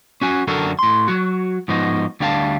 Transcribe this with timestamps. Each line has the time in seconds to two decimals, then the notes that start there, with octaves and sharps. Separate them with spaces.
0.22 C#4 F#4 G#5
0.47 F#2 D3 D4 F#4 A4 A#4
0.79 A2 C6
1.08 F#3 F#4
1.68 G#2 F3 B3 D#4 F#4
2.20 D2 G3 D4 F5 G5 A5